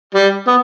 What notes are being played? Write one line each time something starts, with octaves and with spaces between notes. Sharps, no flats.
G3
B3